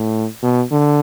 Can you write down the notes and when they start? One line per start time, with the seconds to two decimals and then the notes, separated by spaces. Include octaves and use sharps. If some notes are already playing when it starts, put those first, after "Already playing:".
Already playing: A2
0.43 B2
0.71 D3